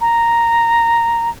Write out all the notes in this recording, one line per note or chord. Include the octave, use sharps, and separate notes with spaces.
A#5